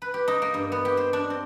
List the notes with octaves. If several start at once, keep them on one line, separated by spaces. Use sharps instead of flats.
B4
G4
D#4
A#3
G2
B3
G4
C5
D4
C4